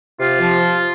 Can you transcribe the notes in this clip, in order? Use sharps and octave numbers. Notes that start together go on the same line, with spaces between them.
C3 F4
F3